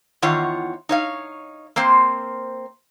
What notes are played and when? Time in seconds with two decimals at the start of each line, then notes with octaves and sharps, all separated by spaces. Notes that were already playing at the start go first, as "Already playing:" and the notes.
0.22 E2 D#3 F4 C#5 F#5
0.89 D#4 C#5 F5
1.76 A#3 C4 C5